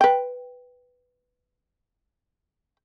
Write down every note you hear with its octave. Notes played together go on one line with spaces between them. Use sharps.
B4 G5